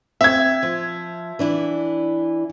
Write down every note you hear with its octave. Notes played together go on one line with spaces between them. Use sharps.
C4 E5 G#6
F3
E3 D4 E4